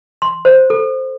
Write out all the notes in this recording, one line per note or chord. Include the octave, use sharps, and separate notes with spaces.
C6
C5
A4